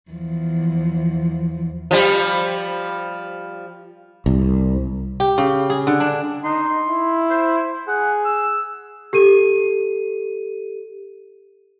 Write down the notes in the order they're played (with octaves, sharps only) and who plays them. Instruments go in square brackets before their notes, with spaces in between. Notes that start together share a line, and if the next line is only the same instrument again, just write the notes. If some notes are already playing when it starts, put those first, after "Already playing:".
[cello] E2 F3
[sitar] F3 G3
[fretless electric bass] C2
[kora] G4
C#3
G#4
D3
D4
[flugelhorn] D#4 [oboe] C6
[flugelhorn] E4
[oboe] C5
[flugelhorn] G#4 [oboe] F#5
[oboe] E6
[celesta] G4 A4 D#7